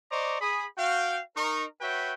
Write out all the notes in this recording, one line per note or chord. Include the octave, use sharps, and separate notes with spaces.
C5 D5 D#5 A#5 C#6 D6
G#4 B5 D#6
F#4 F5 G5
D#4 A#4 C#6
F#4 B4 C#5 E5 G5